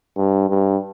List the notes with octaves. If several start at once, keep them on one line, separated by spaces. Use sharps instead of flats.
G2
G2